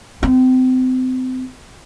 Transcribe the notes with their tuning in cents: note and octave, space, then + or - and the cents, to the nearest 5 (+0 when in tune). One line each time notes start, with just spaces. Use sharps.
C4 -30